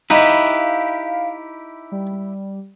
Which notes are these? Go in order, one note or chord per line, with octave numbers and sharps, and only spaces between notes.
D#4 E4 G4 B4 F5
G3